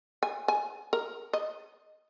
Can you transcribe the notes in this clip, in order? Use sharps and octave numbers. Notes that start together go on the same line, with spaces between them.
G#5
G#5
A#4
D#5